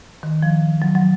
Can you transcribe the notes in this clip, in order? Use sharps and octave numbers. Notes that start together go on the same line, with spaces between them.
D#3
F3
F#3
F#3